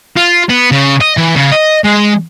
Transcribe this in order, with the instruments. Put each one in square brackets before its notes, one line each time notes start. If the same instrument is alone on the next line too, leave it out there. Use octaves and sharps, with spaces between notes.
[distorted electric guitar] F4
B3
C#3
D#5
E3
C#3
D#5
G#3